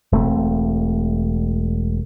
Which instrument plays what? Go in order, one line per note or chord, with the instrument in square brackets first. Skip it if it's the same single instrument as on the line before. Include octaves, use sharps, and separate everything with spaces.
[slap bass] E1 A3 C4